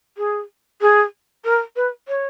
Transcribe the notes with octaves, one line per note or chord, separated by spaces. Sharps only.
G#4
G#4
A#4
B4
C#5